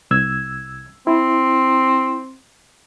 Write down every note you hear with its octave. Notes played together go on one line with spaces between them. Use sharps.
C2 E6 G#6
C4 E4